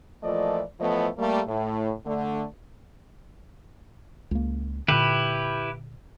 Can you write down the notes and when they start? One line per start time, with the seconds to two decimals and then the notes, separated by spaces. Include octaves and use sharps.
0.23 A#2 E3 F3 A3 D5 D#5
0.80 A2 E3 F3 A3 B3 D#5
1.18 G3 A3 A#3
1.47 A2
2.06 D3 A3
4.31 C#2 A#3
4.88 A#2 D3 E4 G4 B4